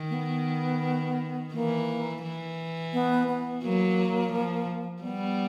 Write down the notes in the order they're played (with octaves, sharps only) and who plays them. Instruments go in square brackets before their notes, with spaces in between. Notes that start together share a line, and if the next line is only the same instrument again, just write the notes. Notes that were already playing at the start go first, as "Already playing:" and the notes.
Already playing: [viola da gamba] D#3
[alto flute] A#3
B3
[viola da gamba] E3 [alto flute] A#3
[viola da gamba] E3
[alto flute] B3
B3
[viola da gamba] F#3 [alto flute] A#3
[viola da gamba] F3
[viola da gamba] G3 [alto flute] B3